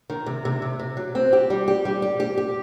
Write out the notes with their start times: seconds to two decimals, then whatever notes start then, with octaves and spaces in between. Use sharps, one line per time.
0.10 D#3
0.26 C3
0.45 C3
0.62 C3
0.79 C3
0.97 F#3
1.15 C4
1.33 G4
1.50 G3
1.68 G4
1.85 G3
2.02 G4
2.20 G4
2.37 G4